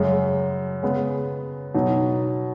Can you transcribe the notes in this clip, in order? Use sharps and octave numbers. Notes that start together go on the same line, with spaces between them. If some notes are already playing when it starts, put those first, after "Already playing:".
Already playing: F#2 C#3 G#3
C#3 G#3 B3
B2 F#3 D#4